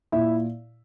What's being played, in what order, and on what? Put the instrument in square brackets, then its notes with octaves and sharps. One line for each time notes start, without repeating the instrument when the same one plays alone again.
[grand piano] A#2 E4 E5